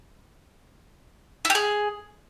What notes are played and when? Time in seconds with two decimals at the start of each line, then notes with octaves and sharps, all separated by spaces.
1.45 E4
1.50 G4
1.55 G#4